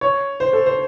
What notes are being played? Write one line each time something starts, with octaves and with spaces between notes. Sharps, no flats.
C#5
C5
A4
C5